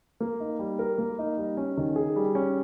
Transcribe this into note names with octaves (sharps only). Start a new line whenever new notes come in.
A#3
D#4
G3
A#4
A#3
D#4
G3
C#4
D#3
G#4
G3
C#4